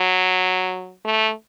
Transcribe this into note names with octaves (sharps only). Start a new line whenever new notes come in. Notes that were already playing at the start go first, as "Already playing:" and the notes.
Already playing: F#3
A3